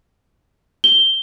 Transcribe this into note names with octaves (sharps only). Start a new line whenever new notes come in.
G7